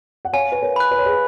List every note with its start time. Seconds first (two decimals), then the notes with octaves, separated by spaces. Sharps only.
0.25 F#5
0.33 C#5 F5 G#5
0.52 B4
0.62 A#4 C#5
0.76 B5 F#6
0.91 B4
0.98 C#5
1.06 G#4 B4